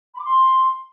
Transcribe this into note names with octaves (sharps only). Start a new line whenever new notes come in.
B5
D6
C6